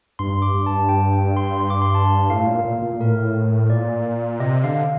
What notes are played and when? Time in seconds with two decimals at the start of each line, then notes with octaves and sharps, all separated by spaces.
0.19 G2 C6
0.42 D6
0.54 G2
0.66 A5
0.89 G5
1.13 G5
1.37 C6
1.60 C6
1.70 D6
1.82 C6
1.94 A5
2.30 A2 F5
2.47 A#2
2.65 A#2
2.82 A#2
3.00 A2 A#4
3.70 A#2 D5
4.40 C3 D#5
4.64 D3 F5